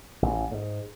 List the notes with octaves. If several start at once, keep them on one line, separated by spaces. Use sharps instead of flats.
A1
G#2